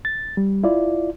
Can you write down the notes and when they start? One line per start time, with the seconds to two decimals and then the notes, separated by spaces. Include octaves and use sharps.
0.05 A6
0.37 G3
0.64 E4 F4 D5